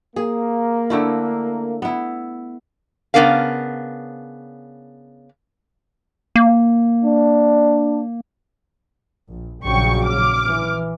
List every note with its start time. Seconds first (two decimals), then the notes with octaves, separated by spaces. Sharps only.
0.16 A#3 G#4
0.90 D3 A3 E4
1.82 B3 E4
3.14 C#3 E3 B3 D4 A#4 F5
6.36 A#3
7.04 D4
9.29 A#1
9.64 A#1 C#3 F#3 G5 C#6
10.06 D6 F6
10.48 E3